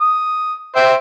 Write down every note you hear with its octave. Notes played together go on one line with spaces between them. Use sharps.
D#6
C5 E5 G5